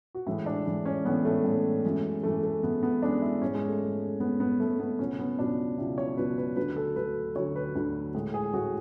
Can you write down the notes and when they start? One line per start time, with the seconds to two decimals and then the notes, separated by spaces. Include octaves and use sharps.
0.15 F#4
0.27 A2 E3 G#3 E4
0.46 D4
0.66 A2 E3 G#3
0.85 C#4
1.05 A2 E3 G#3 B3
1.25 A3
1.45 A2 E3 G#3
1.84 F#2 E3 G#3
2.23 F#2 E3 G#3 A3
2.43 A3
2.63 F#2 E3 G#3 B3
2.83 B3
3.02 F#2 E3 G#3 D4
3.22 E4
3.42 G#2 G#3 C#4
3.55 G#3
3.68 A3
3.81 G#2 G#3
4.20 G#2 G#3 B3
4.40 B3
4.60 G#2 G#3 A3
4.79 B3
4.99 C#2 B2 F#3 C#4
5.19 B3
5.39 C#2 B2 F#3 D4
5.78 C#2 B2 F#3 E4
5.98 C#5
6.17 C#2 B2 F#3 B4
6.38 B4
6.56 D2 D3 F#3 B4
6.76 A4
6.96 D2 D3 F#3 B4
7.35 D2 D3 F#3 C#5
7.56 B4
7.75 D2 D3 F#3
8.15 A2 G#3
8.34 G#4
8.54 A2 G#3 F#4